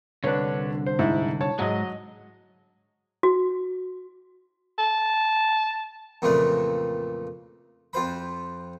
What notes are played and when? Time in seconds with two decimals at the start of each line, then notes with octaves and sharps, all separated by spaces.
0.24 C2 D3 D4 B4 C#5
0.86 C5
0.99 G#2 E4
1.41 C#5 A5
1.59 G#2 F#3 G#3 D#5
3.23 F#4
4.78 A5
6.22 F2 A#2 C#3 E3 A3 D4
7.93 F2 F4 C5 B5